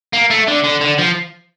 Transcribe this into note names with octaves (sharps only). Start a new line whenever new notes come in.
A#3
A3
D3
D3
D3
F3